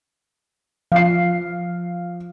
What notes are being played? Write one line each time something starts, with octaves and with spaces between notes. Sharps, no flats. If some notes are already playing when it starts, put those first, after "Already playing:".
F3 F5 C7